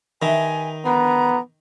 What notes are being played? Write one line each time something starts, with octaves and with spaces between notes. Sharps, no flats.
D#3 D#4 G4 B4 E5 G#5
G#2 D3 F3 B3 A#5